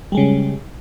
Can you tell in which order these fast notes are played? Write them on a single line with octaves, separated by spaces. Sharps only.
G3 G#3 C#3